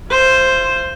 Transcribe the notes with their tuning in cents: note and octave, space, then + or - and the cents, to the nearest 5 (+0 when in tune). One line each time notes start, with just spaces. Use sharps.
F4 -45 C5 +0